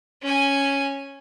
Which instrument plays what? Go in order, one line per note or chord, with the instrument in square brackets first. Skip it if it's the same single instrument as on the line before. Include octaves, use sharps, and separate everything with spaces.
[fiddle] C#4 G#5